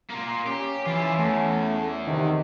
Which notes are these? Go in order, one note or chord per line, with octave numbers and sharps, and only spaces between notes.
A#3 F4
C#4 G4
E3 E4 F4
E2 A3
C3 D#3